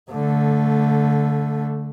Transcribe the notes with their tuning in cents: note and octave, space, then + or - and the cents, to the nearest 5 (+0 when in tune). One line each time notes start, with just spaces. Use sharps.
D3 -20 A3 +0